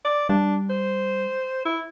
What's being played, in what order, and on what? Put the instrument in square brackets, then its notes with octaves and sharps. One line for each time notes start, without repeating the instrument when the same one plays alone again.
[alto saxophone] D5
[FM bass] G3 [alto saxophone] D4
[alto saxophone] C5
E4